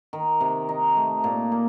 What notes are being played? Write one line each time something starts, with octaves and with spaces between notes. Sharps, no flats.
D#3
C3
D#4
A3
A#2
A#3